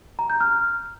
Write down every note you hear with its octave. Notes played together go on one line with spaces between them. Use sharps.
A#5
G6
F6